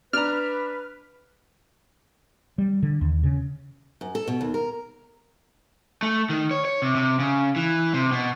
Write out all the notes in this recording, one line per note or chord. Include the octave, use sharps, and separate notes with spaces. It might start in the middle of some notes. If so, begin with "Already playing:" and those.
D4 B4 A#5 F6
G3
D3
D#2
C#3
F#2
A4
B2
D#2
A#4
A3
D#3
C#5
C#5
C3
C3
C#3
E3
C3
B2